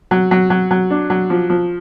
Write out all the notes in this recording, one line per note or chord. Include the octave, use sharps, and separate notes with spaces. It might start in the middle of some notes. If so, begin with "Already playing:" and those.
F#3
F#3
F#3
F#3
D4
F#3
F3
F3